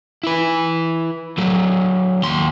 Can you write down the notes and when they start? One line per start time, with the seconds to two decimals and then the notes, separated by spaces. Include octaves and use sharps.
0.23 E4 B4
1.38 F#3 A3
2.22 D#2 C6